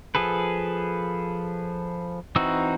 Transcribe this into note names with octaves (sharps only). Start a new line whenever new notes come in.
F3 G#4 A4 B4
E3 C4 D#4 F#4 E6